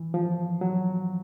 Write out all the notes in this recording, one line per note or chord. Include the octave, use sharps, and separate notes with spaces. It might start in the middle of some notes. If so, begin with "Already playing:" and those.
Already playing: E3
F3
F#3